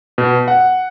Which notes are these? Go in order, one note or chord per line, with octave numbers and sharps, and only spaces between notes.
B2
F#5